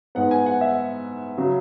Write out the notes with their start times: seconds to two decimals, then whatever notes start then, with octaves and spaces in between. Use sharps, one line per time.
0.15 G#2 G#3 B3 F#5
0.31 G#5
0.46 F#5
0.61 E5
1.38 C#3 F#3